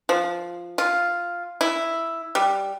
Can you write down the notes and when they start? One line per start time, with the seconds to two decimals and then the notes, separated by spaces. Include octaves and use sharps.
0.09 F3
0.78 F4
1.61 E4
2.35 G3